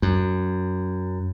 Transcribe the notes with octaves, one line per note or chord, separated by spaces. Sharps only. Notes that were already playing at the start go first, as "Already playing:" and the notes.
F#2